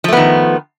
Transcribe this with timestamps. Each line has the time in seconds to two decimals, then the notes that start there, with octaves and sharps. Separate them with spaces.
0.04 F3
0.08 A3
0.13 B3
0.17 D#3